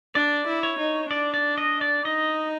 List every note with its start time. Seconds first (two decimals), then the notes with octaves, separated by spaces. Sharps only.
0.15 D4 D5
0.46 E4
0.63 C#5
0.79 D#4
1.10 D4 D5
1.34 D5
1.58 D#5
1.81 D5
2.05 D#4 D#5